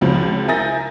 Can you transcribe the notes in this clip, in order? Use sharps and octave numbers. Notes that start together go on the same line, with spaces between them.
F#1 C#2 F3 F#3 C4
A#4 E5 G#5 G6 A6 A#6